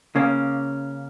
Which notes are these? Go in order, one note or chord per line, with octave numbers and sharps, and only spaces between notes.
C#3 A#3 C#4